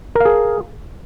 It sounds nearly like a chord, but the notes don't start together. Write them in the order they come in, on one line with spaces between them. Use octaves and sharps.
A#4 F5 G#4